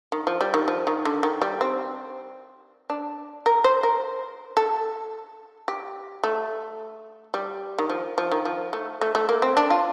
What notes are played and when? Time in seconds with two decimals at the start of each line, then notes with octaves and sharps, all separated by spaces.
0.12 D#3
0.27 F3
0.41 G3
0.54 D#3
0.68 F3
0.87 D#3
1.05 D3
1.23 D#3
1.42 G3
1.61 C4
2.90 D4
3.46 A#4
3.64 C5
3.83 A#4
4.57 A4
5.68 G4
6.24 A3
7.34 G3
7.79 D#3
7.90 F3
8.18 F3
8.31 D#3
8.45 F3
8.73 A3
9.01 A3
9.15 A3
9.29 A#3
9.42 C4
9.57 D4
9.70 F4